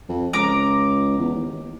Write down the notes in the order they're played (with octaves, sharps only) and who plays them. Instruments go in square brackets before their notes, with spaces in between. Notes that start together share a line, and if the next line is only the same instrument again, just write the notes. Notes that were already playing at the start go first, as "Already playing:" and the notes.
[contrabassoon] F2
[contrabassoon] C#2 [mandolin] A#5 D6
[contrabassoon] E2
D#2